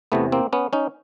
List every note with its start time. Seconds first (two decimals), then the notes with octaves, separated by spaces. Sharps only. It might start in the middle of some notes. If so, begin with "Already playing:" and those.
0.12 E2 C3 E3 A3 B3
0.32 A#3 C4
0.53 B3 C#4
0.73 C#4 D#4